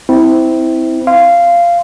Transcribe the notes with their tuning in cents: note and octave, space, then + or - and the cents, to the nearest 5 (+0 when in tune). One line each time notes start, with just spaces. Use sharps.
C4 -15 E4 -20
F5 -15 C6 -10